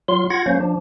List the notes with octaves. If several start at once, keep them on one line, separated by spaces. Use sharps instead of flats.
F#3 F4 C6
F4 F#5 G#6 A#6
F#3 A#3 C#4 C5
F3 D4